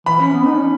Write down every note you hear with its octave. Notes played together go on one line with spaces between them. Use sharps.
E3 B5
C#4
B3
D#4
C#4